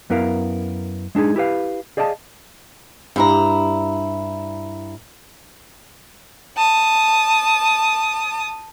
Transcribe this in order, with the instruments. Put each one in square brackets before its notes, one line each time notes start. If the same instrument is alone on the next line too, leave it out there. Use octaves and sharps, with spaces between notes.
[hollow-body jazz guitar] F#2 B3 E4 A#4 F5
G#3 D4 D#4 G#4
E4 G4 B4 F5
G#4 D5 D#5 F5 G5 A5
[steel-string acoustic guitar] G2 E4 A#5
[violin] A5 D#6